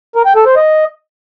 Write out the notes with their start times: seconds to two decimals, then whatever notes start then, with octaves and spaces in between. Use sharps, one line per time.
0.16 A#4
0.26 G5
0.36 A4
0.46 C5
0.56 D#5